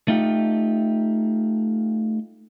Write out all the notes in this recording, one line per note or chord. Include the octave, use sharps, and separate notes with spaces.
A3 D#4 F4 G4